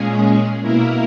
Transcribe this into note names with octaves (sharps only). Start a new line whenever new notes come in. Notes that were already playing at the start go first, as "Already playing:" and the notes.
Already playing: A#2 G#3 C#4 G#4
B2 A#3 E4 A#4